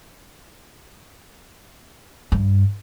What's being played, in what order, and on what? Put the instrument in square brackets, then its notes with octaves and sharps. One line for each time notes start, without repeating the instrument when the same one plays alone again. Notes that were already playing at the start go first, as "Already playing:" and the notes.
[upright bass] G2